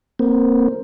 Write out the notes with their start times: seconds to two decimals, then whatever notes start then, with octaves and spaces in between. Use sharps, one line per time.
0.19 A#3 C4